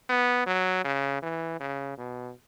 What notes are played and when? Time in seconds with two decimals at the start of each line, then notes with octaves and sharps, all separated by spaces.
0.09 B3
0.47 F#3
0.84 C#3
1.22 E3
1.60 C#3
1.98 B2